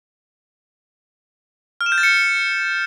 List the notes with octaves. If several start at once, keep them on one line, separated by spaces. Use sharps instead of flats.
F6
E7
G6
A6
C#7